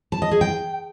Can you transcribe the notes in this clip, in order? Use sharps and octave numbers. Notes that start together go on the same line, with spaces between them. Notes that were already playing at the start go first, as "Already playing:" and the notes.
A5
D#5
G#4
G5